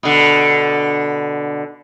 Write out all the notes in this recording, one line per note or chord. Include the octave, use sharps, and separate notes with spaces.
B2 D3